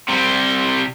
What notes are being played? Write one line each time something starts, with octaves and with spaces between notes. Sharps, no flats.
C3 G3